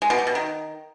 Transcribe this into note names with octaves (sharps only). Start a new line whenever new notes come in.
G#3
B2
G3
B2
D#3